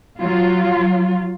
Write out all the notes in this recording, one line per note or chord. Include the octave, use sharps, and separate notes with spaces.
F#3 F4